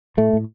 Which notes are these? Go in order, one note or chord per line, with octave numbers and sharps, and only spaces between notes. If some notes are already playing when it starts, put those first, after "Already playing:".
A2 A3
A2